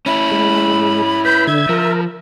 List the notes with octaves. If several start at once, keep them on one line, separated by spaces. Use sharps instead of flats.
C#4 E4 B5
G#3
B4 B5 G6
D3 E5 G#6
F3 A#4